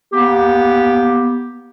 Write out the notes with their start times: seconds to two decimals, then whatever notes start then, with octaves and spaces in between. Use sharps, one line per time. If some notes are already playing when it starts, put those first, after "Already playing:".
0.13 A#3 B3 G4